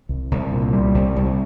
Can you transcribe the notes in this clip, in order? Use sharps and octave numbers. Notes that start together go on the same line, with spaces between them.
C2
C2
A#2
G3
C2
C2